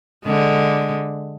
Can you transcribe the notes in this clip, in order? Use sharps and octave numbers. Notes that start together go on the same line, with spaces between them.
D3 G#3